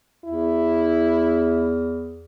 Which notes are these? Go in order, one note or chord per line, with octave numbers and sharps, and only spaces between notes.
E2 E4